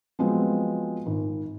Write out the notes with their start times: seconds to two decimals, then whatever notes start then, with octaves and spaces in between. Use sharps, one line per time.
0.19 F3 F#3 G#3 B3 C4
1.06 G#1